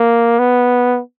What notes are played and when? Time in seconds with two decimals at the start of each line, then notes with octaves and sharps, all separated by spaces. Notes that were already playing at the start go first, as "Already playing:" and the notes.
Already playing: A#3
0.39 B3